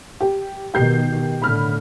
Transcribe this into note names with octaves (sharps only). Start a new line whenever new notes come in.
G4
B2 D#3 G4 G6 C7
A2 D3 B5 F6